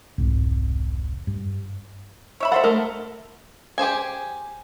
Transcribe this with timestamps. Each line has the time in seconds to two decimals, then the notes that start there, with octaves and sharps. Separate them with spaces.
0.18 E1 C2 G#2
1.27 G2
2.40 C#5 E5 B5
2.52 A4 C5 E5 F#5
2.64 A3 A#4 D#5
3.78 G4 G#4 C5 G#5